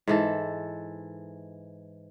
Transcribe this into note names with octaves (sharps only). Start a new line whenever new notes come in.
G#2 E3 A4